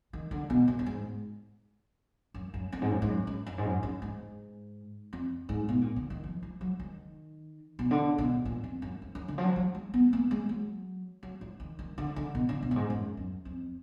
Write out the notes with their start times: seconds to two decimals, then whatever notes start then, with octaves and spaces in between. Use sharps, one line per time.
0.13 D#3
0.31 D3
0.50 B2
0.68 F#2
0.79 F#2
0.86 G#2
2.34 F#2
2.54 F#2
2.72 F2
2.82 G#2
2.91 F#2
3.02 G#2
3.08 F#2
3.27 F#2
3.46 F#2
3.58 G#2
3.65 F#2
3.83 F#2
4.02 G#2
5.13 F2
5.49 G#2
5.69 B2
5.81 A#2
5.96 D3
6.10 D#3
6.24 F3
6.43 F3
6.61 F#3
6.80 D#3
7.79 B2
7.91 D3
8.18 B2
8.45 A#2
8.64 F2
8.82 F#2
9.02 F2
9.15 F#2
9.28 D3
9.38 F3
9.43 F#3
9.56 F#3
9.75 G#3
9.94 B3
10.13 A#3
10.31 G#3
10.49 F#3
11.23 F#3
11.41 F3
11.60 D#3
11.79 D#3
11.98 D3
12.16 D3
12.35 B2
12.49 D3
12.62 B2
12.71 F#2
12.76 G#2
12.90 F#2
13.17 F#2
13.45 F2